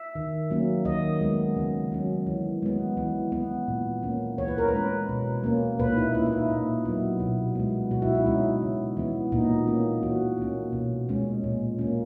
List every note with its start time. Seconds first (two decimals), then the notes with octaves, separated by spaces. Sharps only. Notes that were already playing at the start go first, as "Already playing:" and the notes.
Already playing: E5
0.15 D#3
0.50 F#3 A#3 C#4
0.85 D#3 D#5
1.21 G#3 B3
1.56 C#3
1.92 F#3 C#4
2.27 E3
2.62 G#3 B3
2.97 E3
3.32 B3
3.68 A#2
4.03 A#3 C#4
4.38 E3 C#5
4.48 B4
4.58 A#4
4.68 B4
4.73 G#3 C#4
5.09 B2
5.44 A#3 C#4
5.79 A#2 B4
5.93 D#4
5.97 E4
6.14 A#3 C#4 E4
6.26 E4
6.32 D#4
6.50 A#2
6.85 F#3 B3
7.20 B2
7.55 G#3 B3
7.91 B2 F#4
8.02 E4
8.15 D#4
8.26 G#3 C#4 E4
8.62 C#3
8.97 E3 B3
9.32 A#2 D#4
9.67 A#3 C#4
10.03 E3 F#4
10.38 A#3 C#4
10.73 B2
11.09 G#3 C#4
11.44 A#2
11.79 A#3 C#4